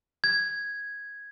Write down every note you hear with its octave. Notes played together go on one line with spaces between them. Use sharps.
G#6